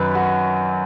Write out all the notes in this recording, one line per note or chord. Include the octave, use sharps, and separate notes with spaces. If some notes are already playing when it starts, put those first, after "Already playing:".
Already playing: F#2 D#3 F#3 B4
F#4